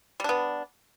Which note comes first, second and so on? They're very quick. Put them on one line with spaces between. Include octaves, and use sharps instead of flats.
G3 D4 B3